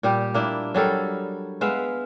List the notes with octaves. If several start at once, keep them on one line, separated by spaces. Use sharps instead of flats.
A#2 G3 G4
A#3 D4 E4
F#3 G3 A4 A#4
G#3 B3 E5 F5